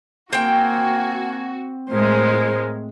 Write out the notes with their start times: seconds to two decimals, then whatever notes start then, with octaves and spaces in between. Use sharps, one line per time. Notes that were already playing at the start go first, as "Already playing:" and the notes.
0.33 A#3 C4 F#4 G5 G#5
1.90 A2 G#3 A#4 C5